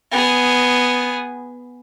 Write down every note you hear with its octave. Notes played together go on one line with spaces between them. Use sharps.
B3 G#4